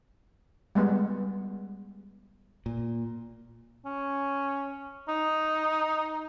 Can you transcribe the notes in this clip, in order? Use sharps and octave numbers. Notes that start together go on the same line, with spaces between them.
G3 G#3 B3
A#2
C#4
D#4